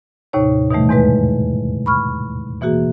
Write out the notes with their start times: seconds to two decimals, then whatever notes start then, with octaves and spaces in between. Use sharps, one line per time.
0.33 D#2 A2 C3 D#4 C#5
0.71 B2 D#3 E3 G3 A3
0.89 E2 G#2 G#3 B4
1.86 B5 C#6 F6
2.61 B2 E3 A#3 F#4 G#4